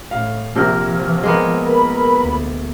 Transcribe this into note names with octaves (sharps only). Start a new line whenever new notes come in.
A2 F5
A#1 C3 F3 A#4 F6
G#3 A#3 B3
A#4 B4 B5
D2